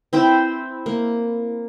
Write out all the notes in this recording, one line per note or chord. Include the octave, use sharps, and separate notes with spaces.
C4 E4 C5 G5
A#3